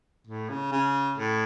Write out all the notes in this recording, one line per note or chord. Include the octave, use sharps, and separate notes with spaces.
A2
C#3
C#3
A2